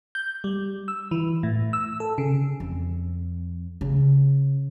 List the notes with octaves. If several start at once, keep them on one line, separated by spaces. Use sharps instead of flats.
G6
G3
E6
E3
A2
E6
A4
C#3
F2
C#3